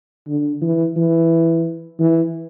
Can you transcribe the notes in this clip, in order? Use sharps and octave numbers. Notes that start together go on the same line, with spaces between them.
D3
E3
E3
E3